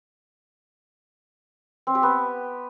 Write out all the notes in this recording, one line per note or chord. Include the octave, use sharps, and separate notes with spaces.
C4
G4
B3